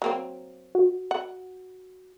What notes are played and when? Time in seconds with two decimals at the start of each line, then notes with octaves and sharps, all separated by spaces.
0.02 F#3 A#3 C4
0.75 F#4
1.11 F#5